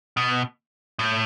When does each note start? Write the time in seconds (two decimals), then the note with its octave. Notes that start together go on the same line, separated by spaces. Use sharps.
0.17 B2
0.99 A2